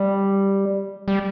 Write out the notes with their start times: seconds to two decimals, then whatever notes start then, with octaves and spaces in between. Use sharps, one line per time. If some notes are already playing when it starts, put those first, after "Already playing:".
Already playing: G3
1.08 G3